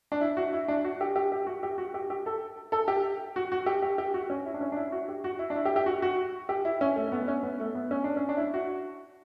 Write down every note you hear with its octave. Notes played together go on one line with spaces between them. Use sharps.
D4
E4
F#4
E4
D4
F#4
G4
G4
G4
F#4
G4
F#4
G4
G4
A4
A4
G4
F#4
F#4
G4
G4
G4
F#4
C#4
E4
D4
C#4
D4
E4
F#4
G4
F#4
E4
D4
E4
G4
G4
F#4
F#4
G4
E4
C#4
A3
A3
B3
C#4
B3
A3
B3
C#4
D4
C#4
D4
E4
F#4